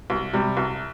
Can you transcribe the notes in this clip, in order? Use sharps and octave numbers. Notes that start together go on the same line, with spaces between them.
C2
C3 G3
C2